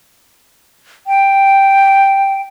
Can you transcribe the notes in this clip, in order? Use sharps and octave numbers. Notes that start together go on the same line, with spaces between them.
G5